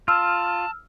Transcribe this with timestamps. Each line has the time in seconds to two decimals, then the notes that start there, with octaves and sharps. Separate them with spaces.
0.08 F4 A5 E6 F6